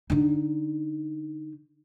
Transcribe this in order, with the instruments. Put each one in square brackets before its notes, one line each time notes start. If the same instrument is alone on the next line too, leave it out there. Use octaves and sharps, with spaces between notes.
[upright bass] D3 D#4